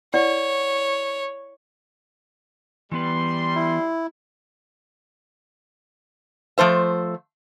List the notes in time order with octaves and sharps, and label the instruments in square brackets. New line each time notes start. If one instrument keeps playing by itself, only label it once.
[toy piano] E4 D5 F#5 [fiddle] C#5
[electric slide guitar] E3 B3 B4 [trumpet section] G3 C6
[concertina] E4
[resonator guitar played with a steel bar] F3 A3 C5 E5